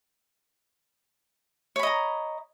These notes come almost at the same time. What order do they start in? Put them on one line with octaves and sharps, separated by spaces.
C#5 B5 D#5 A#5